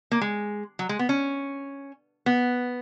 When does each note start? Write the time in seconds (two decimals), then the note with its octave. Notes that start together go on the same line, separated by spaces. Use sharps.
0.11 A#3
0.21 G#3
0.79 F#3
0.89 G#3
0.99 B3
1.09 C#4
2.26 B3